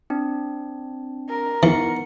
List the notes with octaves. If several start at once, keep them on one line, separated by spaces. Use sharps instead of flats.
C4 D4
A#4
E3 B3 D#4 C#7